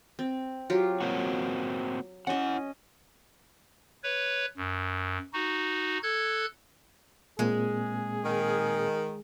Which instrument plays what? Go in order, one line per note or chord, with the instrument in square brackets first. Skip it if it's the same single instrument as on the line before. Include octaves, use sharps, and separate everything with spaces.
[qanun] C4
F#3 F4 G4
[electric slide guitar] A#3 C4 F#4
[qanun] C#4 D#5 [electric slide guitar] E4 F#5
[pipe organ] B4 C#5
F#2
D#4 F#4
A4 F#6 G#6
[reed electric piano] A#2 A#3 C4 [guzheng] G#3 [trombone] G#4
[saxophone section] D#3